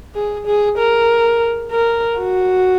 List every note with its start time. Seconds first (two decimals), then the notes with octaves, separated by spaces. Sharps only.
0.15 G#4
0.46 G#4
0.78 A#4
1.71 A#4
2.18 F#4